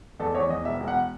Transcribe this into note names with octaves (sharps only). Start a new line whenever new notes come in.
E2 A4
E2 C#5
E2 D#5
E1 E5
E1
F#5